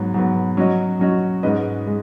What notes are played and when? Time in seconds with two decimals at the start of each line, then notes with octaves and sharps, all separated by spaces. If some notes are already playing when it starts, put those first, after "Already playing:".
Already playing: G#2 F#3 B3
0.14 G#2 F#3 B3
0.57 F#3 C#4 F#4 D#5
0.99 F#3 C#4 F#4 D#5
1.43 G#2 G#3 C#4 B4 D#5
1.87 G#3